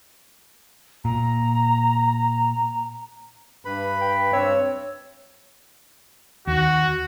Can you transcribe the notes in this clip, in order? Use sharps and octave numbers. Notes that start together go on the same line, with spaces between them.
A#2 A#5
G2 B4 B5
G5
G2 C4 C#5 E6
D#2 F#4